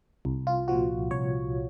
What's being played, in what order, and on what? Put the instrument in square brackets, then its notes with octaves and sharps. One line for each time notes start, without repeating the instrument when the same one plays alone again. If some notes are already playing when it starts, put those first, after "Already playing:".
[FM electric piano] C2
F4
A#2 F3 F#4
C2 C#5